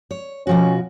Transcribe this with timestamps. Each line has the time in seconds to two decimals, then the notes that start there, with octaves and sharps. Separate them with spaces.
0.11 C#5
0.47 B2 F3 C#4 F#4